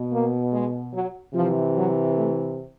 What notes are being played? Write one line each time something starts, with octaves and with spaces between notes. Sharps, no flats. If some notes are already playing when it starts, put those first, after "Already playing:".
Already playing: B2
A#3
G#3
F#3
C3 E3 F3
F#3
A3